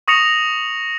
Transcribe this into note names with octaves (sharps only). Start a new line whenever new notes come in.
C#6 D#6 A#6 C#7 F7